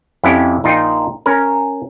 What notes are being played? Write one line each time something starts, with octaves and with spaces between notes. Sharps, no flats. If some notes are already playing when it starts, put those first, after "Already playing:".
F2 C#4 E4 G4 F#5
A#1 D#4 F4 G5
C#4 A#4